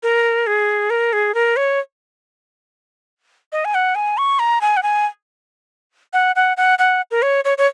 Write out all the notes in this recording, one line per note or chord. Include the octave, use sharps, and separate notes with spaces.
A#4
G#4
A#4
G#4
A#4
C#5
D#5
G#5
F#5
G#5
C#6
A#5
G#5
F#5
G#5
F#5
F#5
F#5
F#5
A#4
C#5
C#5
C#5